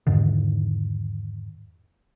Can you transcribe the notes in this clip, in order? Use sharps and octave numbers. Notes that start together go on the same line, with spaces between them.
E2 G#2 D3 D#3